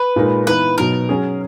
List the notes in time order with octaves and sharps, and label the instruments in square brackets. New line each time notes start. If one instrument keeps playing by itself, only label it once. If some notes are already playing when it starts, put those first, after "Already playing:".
Already playing: [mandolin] B4
[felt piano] A#2 G#3 D#4 A#4
[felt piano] E3 B3 D#4 [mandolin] B4
[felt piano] B2 F#3 B3 D#4 [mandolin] A#4
[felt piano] F#3 C#4 G#4